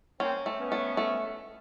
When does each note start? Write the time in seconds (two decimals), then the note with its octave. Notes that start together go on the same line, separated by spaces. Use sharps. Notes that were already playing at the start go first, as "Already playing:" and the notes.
0.20 A#3 C4 C#4
0.46 A3
0.59 B3 C#4
0.72 A3
0.97 A3